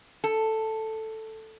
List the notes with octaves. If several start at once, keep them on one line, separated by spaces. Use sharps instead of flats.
A4